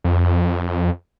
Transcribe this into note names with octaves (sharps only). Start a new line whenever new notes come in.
F2